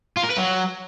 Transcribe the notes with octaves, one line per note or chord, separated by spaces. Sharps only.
F4
A#4
B4
F#3